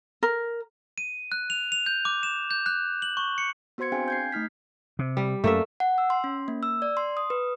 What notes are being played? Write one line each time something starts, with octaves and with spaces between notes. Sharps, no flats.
A#4
D#7
F#6
F7
F7
G6
D6
E7
G6
F#6
F#7
C#6
C#7
B3 F#4 C5 C6 G#6 C#7
C4 D4 G#4 F5 G5 G#5
G6 G#6 C7
A3 D#4 F6 B6
C3
G3
F#2 A3 A#3 E5
F#5
E6
C6
C#4
A#3
E6
D5
C6
D#6
B4